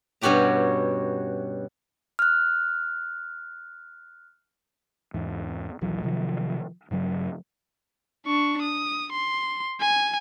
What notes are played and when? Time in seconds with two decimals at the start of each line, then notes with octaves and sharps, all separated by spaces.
0.21 G2 B2 C#4 F#4 G4 A#5
2.19 F6 F#6
5.14 E2 G#2 E3
5.81 D#1 A#1 E3 F#3
6.03 C3 D#3 F3 F#3
6.91 G2 C#3 F#3
8.26 D4 C#6
8.62 D#6
9.13 C6
9.81 G#5